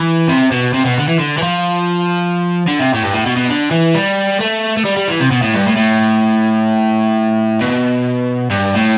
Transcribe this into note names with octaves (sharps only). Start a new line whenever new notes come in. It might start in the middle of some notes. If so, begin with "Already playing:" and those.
Already playing: E3
C3
B2
C3
B2
D3
E3
D3
E3
F3
D3
C3
A2
G2
A2
B2
B2
D3
E3
G3
A3
A3
G3
G3
E3
C3
B2
A2
G2
A2
A2
B2
G2
A2